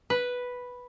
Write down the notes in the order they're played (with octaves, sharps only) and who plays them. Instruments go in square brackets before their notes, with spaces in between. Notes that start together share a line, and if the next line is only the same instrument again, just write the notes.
[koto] B4